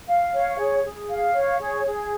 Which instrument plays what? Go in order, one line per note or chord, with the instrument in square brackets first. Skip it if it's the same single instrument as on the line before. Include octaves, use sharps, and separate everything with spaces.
[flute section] F5
C#5
G#4
G#4
F5
C#5
G#4
G#4